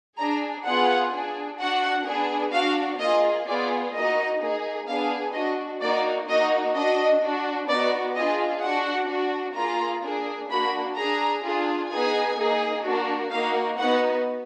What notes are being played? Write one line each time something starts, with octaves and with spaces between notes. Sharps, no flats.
D4 G#4 A#5
B3 F4 G#4 F#5
D4 G#4
D4 F#4 F#5
B3 D4 G#4
D4 F#4 F5
A#3 F4 G#4 D#5
B3 F4 G#4 D5
A#3 D#4 F#4 D#5
A#3 D#4 G#4
B3 D4 G#4 F5
D4 F#4 D#5
A#3 D#4 F#4 D5
A#3 D#4 F#4 D#5
D4 F#4 D#5
D4 F#4
B3 D#4 F#4 D5
D4 F4 G#4 D#5
D4 F#4 F#5
D4 F#4
A#3 F4 G#4 A#5
A#3 D4 G#4
A#3 D4 F#4 B5
D4 G#4 A#5
D4 F4 G#4
B3 D#4 G#4 G#5
A#3 D#4 G#4
A#3 D4 F#4
A#3 D#4 F#4 F5
B3 D#4 F#4 F#5